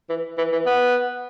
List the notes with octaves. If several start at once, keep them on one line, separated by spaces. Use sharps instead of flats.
E3
E3
E3
B3